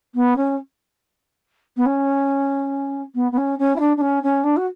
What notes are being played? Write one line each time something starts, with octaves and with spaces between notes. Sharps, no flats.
B3
C#4
B3
C#4
B3
B3
C#4
C#4
E4
D4
D4
C#4
C#4
D4
F#4